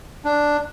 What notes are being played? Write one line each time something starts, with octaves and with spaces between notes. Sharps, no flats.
D4